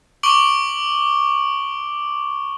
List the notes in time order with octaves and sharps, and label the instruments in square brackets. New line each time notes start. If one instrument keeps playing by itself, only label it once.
[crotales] C#6 D6 D7 F#7 G7